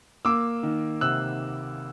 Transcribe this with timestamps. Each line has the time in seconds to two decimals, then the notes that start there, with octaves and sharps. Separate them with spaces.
0.25 A#3 D6 E6
0.63 D#3
1.01 C3 E6 F#6